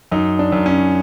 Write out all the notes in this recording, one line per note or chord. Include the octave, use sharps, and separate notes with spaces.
F#2 D#4
D4
F#2
C#4